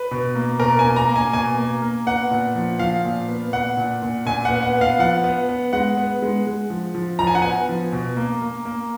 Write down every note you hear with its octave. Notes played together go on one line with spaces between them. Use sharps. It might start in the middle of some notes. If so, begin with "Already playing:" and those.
Already playing: B4
B2
A#3
B2 A#4
G#5
A#3
A#5
A#3
G#5
B2 G#5
A#3
A#3
B3 F#5
A#2
F3
F3 F5
A#2
B3
A#2 F#5
A#2
A#2
A#2 G#5
F#5
B3
F#5
B3
F5
F3 F#5
B3
B3
G#3 F#5
B3
G#3
G#3
F3
F3
F3 A#5
G#5
F#5
B3 G#5
F3
B2
A#3
A#3
A#3